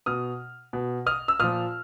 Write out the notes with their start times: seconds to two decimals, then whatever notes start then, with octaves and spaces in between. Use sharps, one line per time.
0.06 B2 D#6 F6
0.73 B2
1.06 D#6 F6
1.28 E6
1.40 A#2 F3 D#6 F6